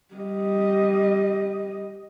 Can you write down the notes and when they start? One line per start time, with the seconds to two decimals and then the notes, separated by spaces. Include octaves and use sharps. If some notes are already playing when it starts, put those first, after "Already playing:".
0.14 G3 D#5